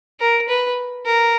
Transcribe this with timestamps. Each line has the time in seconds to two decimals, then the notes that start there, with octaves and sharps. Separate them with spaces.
0.20 A#4
0.49 B4
1.05 A#4